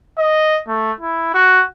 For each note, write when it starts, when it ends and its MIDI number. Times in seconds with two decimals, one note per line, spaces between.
0.18 0.59 75
0.68 0.92 57
1.00 1.34 64
1.34 1.63 66